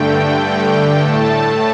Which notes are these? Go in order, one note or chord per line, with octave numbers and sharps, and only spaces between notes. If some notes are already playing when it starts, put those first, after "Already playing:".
Already playing: G2 D3 A3 G5
A2 A3 A5